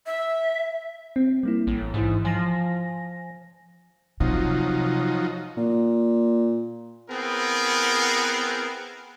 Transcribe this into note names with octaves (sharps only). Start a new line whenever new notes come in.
E5
C4
G3 A#3 E4
A1
G#2 E3 E4
F3 G#5 A#6
C3 F3 F#3 D#4
A#2
B3 C4 E4 G#4 A#4